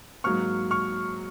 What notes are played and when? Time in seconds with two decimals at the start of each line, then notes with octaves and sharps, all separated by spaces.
0.24 G#2 F#3 A#3 C#6 F6
0.71 C#6 F6